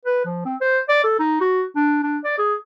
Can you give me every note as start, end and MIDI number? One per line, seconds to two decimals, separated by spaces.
0.05 0.23 71
0.25 0.45 53
0.46 0.55 60
0.61 0.79 72
0.89 1.04 74
1.04 1.17 69
1.20 1.38 63
1.41 1.64 66
1.76 1.99 62
2.04 2.18 62
2.24 2.37 74
2.38 2.55 68